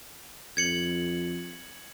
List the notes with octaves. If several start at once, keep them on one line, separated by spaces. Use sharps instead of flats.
F2 G#6 C#7 F#7